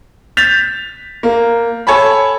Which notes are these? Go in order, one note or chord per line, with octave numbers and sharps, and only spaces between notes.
G6 A6 B6 F7
A#3
A4 C#5 G#5 A5 B5